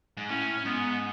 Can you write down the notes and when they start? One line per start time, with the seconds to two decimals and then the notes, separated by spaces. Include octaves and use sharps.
0.17 G#2
0.29 A2 C#4
0.65 G#2 B3